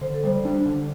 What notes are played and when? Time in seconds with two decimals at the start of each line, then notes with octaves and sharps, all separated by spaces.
0.01 D3 C5
0.14 A4
0.24 G3 C5
0.45 D4
0.66 D3